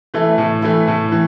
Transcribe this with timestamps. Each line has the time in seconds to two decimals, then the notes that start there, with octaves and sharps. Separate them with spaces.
0.14 E3 A3 E4
0.38 A2
0.62 E3 A3 E4
0.87 A2
1.12 E3